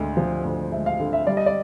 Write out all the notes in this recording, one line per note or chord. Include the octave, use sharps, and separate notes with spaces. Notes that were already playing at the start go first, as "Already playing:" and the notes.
Already playing: D2 D3 G#3
F3
D2
G#3 E5
F5
D3
E5
G3 D5
D#5
D5